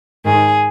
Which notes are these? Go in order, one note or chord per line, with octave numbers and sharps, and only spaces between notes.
G#2 D#3 G#4